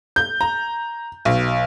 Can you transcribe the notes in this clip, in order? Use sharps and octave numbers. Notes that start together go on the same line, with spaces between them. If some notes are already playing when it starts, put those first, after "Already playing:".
G6
A#5
B1